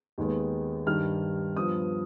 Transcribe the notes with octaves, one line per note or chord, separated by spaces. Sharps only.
D#2 D#3 G#3 B3
G2 D#3 G3 F6
G2 F3 B3 D#6